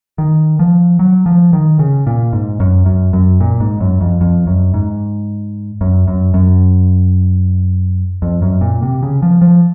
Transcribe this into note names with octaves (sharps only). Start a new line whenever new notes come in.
D#3
F3
F#3
F3
D#3
C#3
A#2
G#2
F#2
F#2
F#2
A#2
G#2
F#2
F2
F2
F#2
G#2
F#2
F#2
F#2
F2
F#2
A#2
C3
C#3
F3
F3